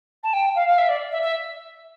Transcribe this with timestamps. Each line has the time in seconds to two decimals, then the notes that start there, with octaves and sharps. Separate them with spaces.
0.23 A5
0.33 G5
0.55 F5
0.67 F5
0.78 E5
0.88 D5
1.11 E5
1.22 E5